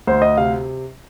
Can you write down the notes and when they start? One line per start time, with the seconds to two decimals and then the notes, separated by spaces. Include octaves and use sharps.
0.07 D2 C5
0.22 D#5
0.37 C3 F5